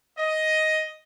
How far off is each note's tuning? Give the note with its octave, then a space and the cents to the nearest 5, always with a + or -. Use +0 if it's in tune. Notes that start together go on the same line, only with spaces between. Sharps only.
D#5 +10